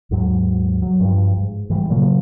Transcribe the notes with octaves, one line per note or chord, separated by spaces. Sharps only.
D#2 G#2 F#3
F#3
G2 F3
G#2
G#2 E3 G3
A#2 C#3 F#3 A#3